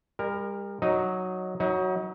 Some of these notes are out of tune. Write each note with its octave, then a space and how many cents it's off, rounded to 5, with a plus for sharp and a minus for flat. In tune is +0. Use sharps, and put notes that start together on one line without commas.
G3 +40 A#4 +0
F#3 -5 D#4 +0 D#5 +5
F#3 +0 D#4 +35